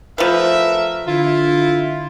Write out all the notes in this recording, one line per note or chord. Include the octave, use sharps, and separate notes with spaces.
F3 A3 A#4 B4 E5
D3 E4 F4